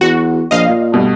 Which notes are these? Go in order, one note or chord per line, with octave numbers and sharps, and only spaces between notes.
E2 F#4
A#1 D#5 F5
A#2
G2 B2 A3